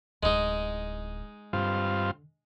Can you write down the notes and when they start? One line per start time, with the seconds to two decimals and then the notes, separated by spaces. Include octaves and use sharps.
0.23 D1 G#3 D#4 E4
1.53 G2 D3 C4 F4